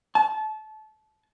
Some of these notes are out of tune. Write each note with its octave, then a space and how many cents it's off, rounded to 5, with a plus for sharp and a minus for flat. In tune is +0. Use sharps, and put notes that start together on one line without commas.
A5 -25